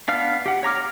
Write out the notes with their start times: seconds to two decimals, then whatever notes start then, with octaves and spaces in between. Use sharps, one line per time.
0.08 B3 D4 F5 F6
0.46 G4 F#5
0.63 C#5 A#5 D6 F6